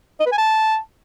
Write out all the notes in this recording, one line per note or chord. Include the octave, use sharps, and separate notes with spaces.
D#5
B4
G#5
A5